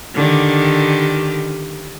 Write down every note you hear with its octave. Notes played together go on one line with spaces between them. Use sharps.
D3 D#3 G4